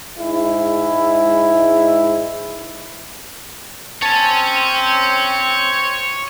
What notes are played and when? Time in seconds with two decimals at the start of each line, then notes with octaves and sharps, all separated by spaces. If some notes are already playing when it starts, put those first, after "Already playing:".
0.18 G#2 G#3 E4
4.02 C4 C#5 G#5 A5